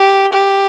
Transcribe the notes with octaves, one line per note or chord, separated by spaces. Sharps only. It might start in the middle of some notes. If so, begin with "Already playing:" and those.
Already playing: G4
G4